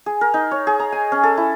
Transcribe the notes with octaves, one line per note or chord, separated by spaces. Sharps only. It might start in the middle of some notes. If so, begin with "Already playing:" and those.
G#4
A#4
D#4
C#5
G#4
A#5
G#5
C#4
A4
E4